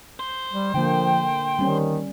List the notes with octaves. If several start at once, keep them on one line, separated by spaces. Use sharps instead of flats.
C5
G3
D3 F3 A#3 G5
D#3 G3 C4 C#4